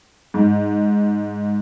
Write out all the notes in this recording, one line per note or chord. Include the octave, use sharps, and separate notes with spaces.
G#2